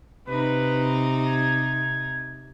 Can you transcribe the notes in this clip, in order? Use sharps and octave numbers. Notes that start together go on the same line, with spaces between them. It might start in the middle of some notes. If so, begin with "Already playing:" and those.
C3 D#4 B4
G#6